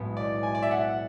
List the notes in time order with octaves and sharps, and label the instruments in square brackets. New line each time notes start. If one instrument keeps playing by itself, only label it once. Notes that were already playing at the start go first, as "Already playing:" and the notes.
Already playing: [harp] B1 A2 G#3 B3
[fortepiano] D5
G#5
D5
E5
F#5